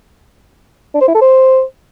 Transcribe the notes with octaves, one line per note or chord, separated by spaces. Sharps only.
D4
C5
E4
A4
C5